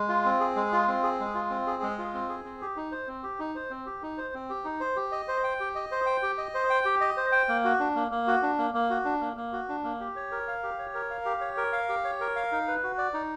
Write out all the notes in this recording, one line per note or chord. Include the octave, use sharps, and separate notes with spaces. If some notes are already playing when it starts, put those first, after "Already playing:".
Already playing: G#3
F4
C4
G#4
G#3
F4
C4
G#4
G#3
F4
C4
G#4
G#3
F4
C4
G#4
C4
G4
D#4
C5
C4
G4
D#4
C5
C4
G4
D#4
C5
C4
G4
D#4
C5
G4
D#5
C5
G5
G4
D#5
C5
G5
G4
D#5
C5
G5
G4
D#5
C5
G5
A#3
F#4
D4
A#3
A#3
F#4
D4
A#3
A#3
F#4
D4
A#3
A#3
F#4
D4
A#3
G4
C#5
A#4
F5
G4
C#5
A#4
F5
G4
C#5
A#4
F5
G4
C#5
A#4
F5
D#4
B4
F#4
D5
D#4